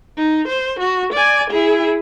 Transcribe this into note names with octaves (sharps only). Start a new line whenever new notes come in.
D#4
C5
F#4
D5 G#5
E4 G#4